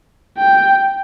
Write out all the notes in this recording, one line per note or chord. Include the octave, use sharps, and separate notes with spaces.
G5